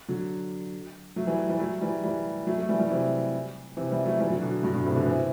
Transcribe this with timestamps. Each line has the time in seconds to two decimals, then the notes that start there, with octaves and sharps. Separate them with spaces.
0.09 D3 F#3
1.16 F#3 A3
1.27 E3 G3
1.49 E3 G3
1.60 F#3 A3
1.81 E3 G3
2.04 E3 G3
2.47 F#3 A3
2.58 F#3 A3
2.69 E3 G3
2.79 E3 G3
2.90 C3 E3
3.77 C3 E3
3.91 E3 G3
4.06 F#3 A3
4.20 E3 G3
4.30 D3 F#3
4.41 B2 D3
4.63 G2 B2
4.74 G2 B2
4.85 A2 C3
4.95 B2 D3
5.06 C3 E3